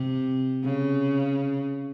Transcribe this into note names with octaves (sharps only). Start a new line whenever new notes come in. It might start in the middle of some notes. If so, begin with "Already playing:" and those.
Already playing: C3
C#3